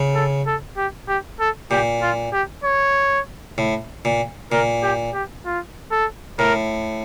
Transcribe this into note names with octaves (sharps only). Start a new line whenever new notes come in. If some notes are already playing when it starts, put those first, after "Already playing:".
Already playing: C#3
A4
A4
G4
G4
A4
A#2 G4
F4
G4
C#5
A2
A#2
A#2 A#4
G4
G4
F4
A4
A2 A#4